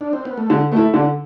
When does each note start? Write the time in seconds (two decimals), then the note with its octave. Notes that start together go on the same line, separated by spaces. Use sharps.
0.01 D4
0.13 C4
0.25 B3
0.38 A3
0.50 D3 G#3
0.72 A3 B3 E4
0.94 D3 D4